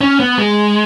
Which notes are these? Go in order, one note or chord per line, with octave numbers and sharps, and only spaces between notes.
C#4
B3
G#3